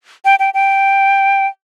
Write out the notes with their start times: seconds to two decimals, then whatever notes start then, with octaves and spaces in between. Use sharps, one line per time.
0.25 G5
0.39 G5
0.54 G5